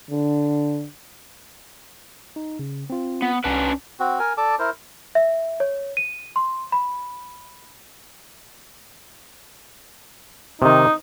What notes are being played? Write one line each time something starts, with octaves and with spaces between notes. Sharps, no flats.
D3
D#4
C#3
C4 F4
B3
C2 C#4 D4 B4 F#5
C4 F#4
A#4 G#5
A4 D5 A5 D6
E4 A#4 C5
E5
C#5
D#7
C6
B5
C3 D#3 D#4